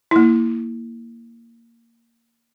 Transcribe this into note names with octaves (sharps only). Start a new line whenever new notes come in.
A#3 E4